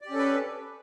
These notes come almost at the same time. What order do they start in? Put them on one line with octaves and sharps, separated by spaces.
D5 G4 C#4 A4 B4